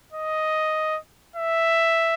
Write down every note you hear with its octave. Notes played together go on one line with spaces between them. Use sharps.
D#5
E5